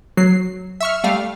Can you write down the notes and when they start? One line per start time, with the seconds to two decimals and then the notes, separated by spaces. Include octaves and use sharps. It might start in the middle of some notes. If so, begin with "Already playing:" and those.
0.17 F#3 C7
0.80 E5 C#6 F6
1.04 G3 A3 F5